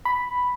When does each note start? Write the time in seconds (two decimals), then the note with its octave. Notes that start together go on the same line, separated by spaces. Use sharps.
0.05 B5